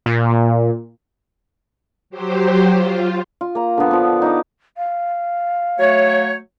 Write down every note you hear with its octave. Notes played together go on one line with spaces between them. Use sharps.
A#2
F#3 G4 C5
F4
F4
A#3 A#5
D3 B3
F3 B3
D#4 D#5 D6
F5
F#3 A3 C#5